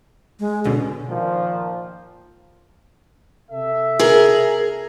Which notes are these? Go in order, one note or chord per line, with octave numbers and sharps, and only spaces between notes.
G#3
B2 D3 C#4
A#2 D#3 F3
C3 A4 E5
G#4 A#4